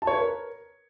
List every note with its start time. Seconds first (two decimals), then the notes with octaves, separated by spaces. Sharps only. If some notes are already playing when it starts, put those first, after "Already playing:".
0.02 A5
0.07 C#5
0.13 B4
0.18 A#4